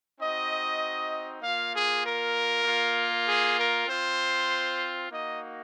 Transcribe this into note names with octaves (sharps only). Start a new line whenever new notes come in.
C4 D#4 F#4 D#5
A#3 F4 F5
G#4
A#4
A#3 F4
G#4
A#4
C4 F4 C5
A#3 D#4 F#4 D#5